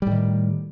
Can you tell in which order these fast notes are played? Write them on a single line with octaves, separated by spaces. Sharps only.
G3 A2 D#3